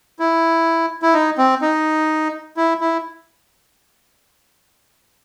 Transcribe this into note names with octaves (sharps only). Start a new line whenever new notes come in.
E4
E4
D#4
C4
D#4
E4
E4